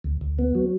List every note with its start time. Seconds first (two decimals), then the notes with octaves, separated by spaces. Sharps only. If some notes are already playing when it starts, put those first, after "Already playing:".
0.04 D2
0.21 D2
0.39 B3
0.55 F#3